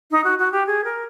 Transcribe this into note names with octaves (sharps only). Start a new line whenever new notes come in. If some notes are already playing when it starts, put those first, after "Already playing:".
D#4
F#4
F#4
G4
G#4
A#4